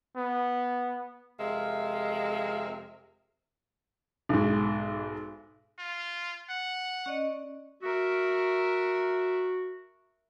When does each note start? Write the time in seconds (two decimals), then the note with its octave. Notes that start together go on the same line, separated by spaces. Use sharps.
0.17 B3
1.40 F2 C3 G#3 A#4 E5 F5
4.29 B1 G#2
5.79 F4
6.50 F#5
7.06 C#4 D5 D#5
7.83 F#4 A#4 E5